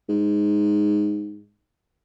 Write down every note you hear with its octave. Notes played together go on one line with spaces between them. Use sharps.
G#2